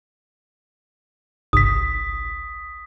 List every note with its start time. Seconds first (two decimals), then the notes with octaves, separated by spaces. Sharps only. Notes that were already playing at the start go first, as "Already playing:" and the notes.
1.53 G1 C2 D#6 B6